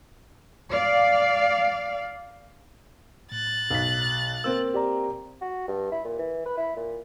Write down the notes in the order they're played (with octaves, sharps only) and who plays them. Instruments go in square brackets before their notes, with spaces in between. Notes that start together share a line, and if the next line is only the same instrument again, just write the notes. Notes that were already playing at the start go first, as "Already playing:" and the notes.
[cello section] D5 F5
[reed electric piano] A2 [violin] F#6 A6
[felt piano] B1 B6
[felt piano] A#3 C4 A#4 [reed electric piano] E6
[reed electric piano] G4 D5 A#5
[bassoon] F#4
G2
E4
A#2
E3
B4
E4
A#2